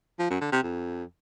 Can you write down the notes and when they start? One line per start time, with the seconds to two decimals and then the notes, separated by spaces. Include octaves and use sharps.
0.19 F3
0.30 F#2
0.41 D3
0.52 C3
0.63 F2